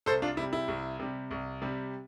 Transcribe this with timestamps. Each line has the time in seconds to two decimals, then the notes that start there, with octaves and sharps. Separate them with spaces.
0.06 C2 A4 C5
0.22 D4 F4
0.37 C3 G3 E4
0.53 E4
0.68 C2
0.99 C3 G3
1.31 C2
1.62 C3 G3